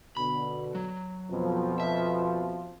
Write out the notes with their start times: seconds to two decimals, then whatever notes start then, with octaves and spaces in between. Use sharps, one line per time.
0.17 B2 D3 B5
0.75 F#3
1.30 F2 B2 F3
1.80 E5